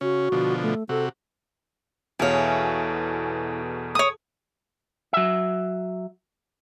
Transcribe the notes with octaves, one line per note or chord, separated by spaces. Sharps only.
C#3 C#4 F#4
B2 D3 F3
A3
C3 F#4 A4
E2 B2 E4 G#4 A4 C#5 F5
C#5 D#6
F#3 E5